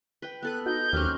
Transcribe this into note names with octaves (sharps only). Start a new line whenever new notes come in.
B4 G5
B3 A4 B4 F#6
D#4 F#4 G6
D#2 F#3 C4 C#4 G4 F6 F#6